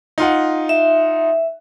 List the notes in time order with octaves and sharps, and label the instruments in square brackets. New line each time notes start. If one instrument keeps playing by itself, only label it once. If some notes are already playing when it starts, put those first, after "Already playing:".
[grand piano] D#4 F4 F#5
[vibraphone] E5